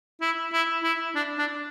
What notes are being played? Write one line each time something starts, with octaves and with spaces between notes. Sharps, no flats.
E4
E4
E4
D4
D4